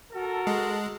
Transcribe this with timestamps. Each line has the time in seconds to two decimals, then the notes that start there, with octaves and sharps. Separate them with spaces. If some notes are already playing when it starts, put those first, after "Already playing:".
0.13 F#4 A4 A#4
0.47 G#3